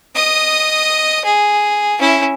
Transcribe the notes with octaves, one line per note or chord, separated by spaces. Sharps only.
D#5 D#6
G#4
C#4 E4